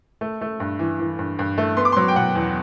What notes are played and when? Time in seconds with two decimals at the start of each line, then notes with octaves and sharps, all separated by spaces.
0.21 A3
0.41 A3
0.60 G2
0.79 E3
1.00 E3
1.19 G2
1.39 G2
1.58 A3
1.77 B3 C6
1.85 D6
1.92 F#3 C6
2.08 G5
2.16 B2 F#5
2.35 E2